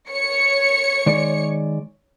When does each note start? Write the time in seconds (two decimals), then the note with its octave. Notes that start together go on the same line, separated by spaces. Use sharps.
0.11 C#5 C#7
1.06 D#3 G#3 D5